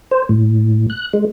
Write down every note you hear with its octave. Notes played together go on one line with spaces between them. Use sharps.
C5
A2
F#6
G#3